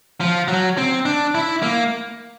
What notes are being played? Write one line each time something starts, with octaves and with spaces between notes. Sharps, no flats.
F3
F#3
C4
D4
E4
A#3